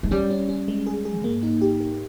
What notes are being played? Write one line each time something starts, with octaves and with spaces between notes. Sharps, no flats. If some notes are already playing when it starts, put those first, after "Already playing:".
G#3
G3 C#4
C#4
C#4
G#3
G#4
G#4
G#2 A#3
D#4
G4
G4